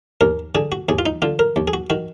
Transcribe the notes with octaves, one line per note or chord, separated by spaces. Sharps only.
D#2 A#4
D3 G#4
F#4
D#2 G#4
F4
D#4
D3 F4
A#4
D#2
G#4
F#4
D#3 F#4